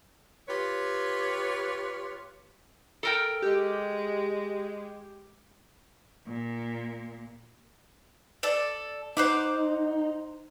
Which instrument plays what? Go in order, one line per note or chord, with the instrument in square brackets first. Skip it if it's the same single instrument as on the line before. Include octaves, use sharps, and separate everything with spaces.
[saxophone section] F4 G4 B4 C#5
[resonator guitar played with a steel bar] A4 A#4 G5
[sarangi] G#3 [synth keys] G4
[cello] A#2
[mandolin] A4 D5
[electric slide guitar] D#4 [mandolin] C5 F#5 D6